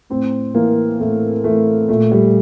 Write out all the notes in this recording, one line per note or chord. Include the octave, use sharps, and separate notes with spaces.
A2 C4
E3 A#3
A2 A3
E3 A3
A#2 A3
G3